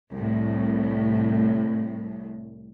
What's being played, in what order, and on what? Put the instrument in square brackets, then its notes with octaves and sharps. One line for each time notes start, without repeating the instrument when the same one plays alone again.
[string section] C2 A2